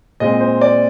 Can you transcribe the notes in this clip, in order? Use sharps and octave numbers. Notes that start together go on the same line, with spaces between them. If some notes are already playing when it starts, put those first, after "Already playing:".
A#2 G#3 C4 D#5
C5
D5